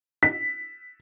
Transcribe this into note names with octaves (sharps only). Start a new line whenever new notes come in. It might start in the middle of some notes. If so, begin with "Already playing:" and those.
B6